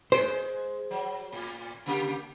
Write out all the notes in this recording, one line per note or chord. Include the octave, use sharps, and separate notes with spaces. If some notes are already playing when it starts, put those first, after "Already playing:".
G#3 C5
F#3
A2
C#3 A#3 G4